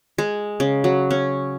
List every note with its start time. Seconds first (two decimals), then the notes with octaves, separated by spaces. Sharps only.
0.18 G#3
0.60 C#3
0.84 F#3
1.11 C#4